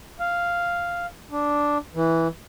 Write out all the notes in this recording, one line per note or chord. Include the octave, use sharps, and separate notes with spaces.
F5
D4
E3